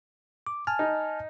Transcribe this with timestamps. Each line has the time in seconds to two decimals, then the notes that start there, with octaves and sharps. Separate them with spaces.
0.47 D6
0.67 G#5 A5 F6
0.79 D#4